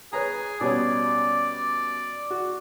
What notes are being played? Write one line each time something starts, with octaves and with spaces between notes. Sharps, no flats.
G#4 B4 C#5 A#5
B2 G3 C#4 D5
F#4